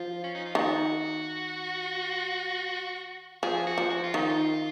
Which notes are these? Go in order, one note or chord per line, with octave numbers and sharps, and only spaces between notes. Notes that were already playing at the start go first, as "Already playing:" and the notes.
Already playing: F3 F4
C#4
D#4
F4
D#3 F#4
F3 G#4
F#4
F3
F#4
F4
D#3 D#4
F4